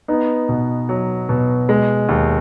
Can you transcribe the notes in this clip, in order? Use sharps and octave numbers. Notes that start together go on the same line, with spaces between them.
B3 D#4
B2
F#3
B2
G#3
D#2